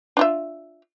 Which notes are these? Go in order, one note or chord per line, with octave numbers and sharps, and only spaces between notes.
D4 F4 E5